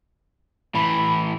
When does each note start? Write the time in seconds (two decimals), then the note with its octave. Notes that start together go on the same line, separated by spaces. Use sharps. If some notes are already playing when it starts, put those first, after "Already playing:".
0.75 A2 E3 B5